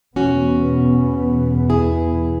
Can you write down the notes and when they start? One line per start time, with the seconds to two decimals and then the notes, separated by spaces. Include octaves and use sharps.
0.16 E2 B2 B3 C#4 F#4
1.69 E4 G#4